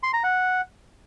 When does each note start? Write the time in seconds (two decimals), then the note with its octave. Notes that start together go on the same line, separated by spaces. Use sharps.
0.03 C6
0.13 A#5
0.24 F#5